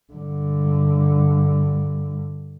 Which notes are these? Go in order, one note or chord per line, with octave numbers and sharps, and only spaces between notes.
G2 D3